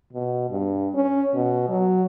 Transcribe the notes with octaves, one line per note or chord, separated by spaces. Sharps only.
B2
G2
C#4
B2
F#3